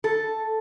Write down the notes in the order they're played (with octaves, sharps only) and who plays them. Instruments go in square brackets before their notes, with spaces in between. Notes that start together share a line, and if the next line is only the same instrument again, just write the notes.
[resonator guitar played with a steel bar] A4